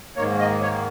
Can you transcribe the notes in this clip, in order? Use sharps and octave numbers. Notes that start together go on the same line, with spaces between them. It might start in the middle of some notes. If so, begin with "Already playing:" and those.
G#2 D#3 A#3 C#5
D#5
C#5